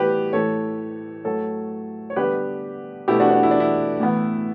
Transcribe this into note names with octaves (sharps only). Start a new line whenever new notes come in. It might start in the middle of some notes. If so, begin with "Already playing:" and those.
Already playing: A2 E3 G3 B3 G4 B4
A2 E3 A3 A4 C#5
A2 F#3 A3 A4 C#5
C#5
D3 G3 B3 G4 B4
B2 A3 E4 G4
D4 F#4
D4
E4
D4
E4
A2 E3 B3